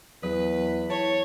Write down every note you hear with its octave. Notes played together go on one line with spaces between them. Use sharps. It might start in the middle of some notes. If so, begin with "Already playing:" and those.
E2 F#3 B4
E4 C#5 A5